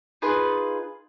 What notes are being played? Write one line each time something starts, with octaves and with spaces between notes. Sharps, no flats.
D#4 F4 G#4 B4